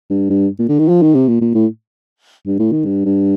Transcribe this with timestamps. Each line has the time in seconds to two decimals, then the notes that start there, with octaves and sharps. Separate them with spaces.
0.10 G2
0.30 G2
0.59 A#2
0.69 D3
0.79 D#3
0.88 F3
1.02 D#3
1.15 C3
1.28 A#2
1.41 A#2
1.54 A2
2.46 G2
2.59 A2
2.72 D#3
2.85 G2
3.05 G2